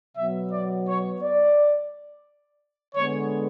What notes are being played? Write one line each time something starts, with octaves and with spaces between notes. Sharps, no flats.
B2 F#3 B3 E5
D5
C#5
D5
D3 G#3 B3 C#5